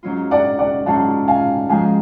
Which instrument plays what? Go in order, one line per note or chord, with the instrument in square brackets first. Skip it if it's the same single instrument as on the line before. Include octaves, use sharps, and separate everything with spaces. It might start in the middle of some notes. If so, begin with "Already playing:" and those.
[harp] G#2 F#3 C#4 F4
[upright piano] D5 F#5
D5 F#5
[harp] G#2 F#3 C#4 F4 [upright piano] F#5 A5
[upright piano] F5 G#5
[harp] G#2 F3 G#3 [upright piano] F5 G#5